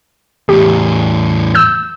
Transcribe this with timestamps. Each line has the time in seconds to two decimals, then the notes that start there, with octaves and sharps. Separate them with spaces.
0.49 E2 A2 G4
1.55 E6 G6